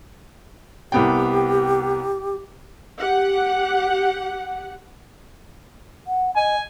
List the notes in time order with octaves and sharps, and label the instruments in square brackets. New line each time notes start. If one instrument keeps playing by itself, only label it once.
[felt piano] C2 B3 G5 [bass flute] G4
[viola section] G4 F#5
[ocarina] F#5
[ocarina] D#5 [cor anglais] G#5